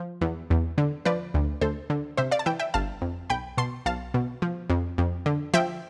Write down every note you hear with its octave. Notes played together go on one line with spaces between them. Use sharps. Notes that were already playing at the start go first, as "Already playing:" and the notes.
Already playing: F3
E2
E2
D3
F3 B4 D5
D2
D2 A4 C5
D3
C3 C5 E5
D5 F5
A5
E3 E5 G5
E5 G5
G1 F5 A5
F2
B1 G5 B5
B2 A5 C6
B1 F5 A5
B2
F3
F2
F2
D3
F3 E5 G5